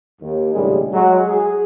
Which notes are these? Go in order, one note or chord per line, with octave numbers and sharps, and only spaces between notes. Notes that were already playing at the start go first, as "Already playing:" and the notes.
D#2
A#1 A2 C#3 G3 G#3
F#3 G#3 F#4
G#4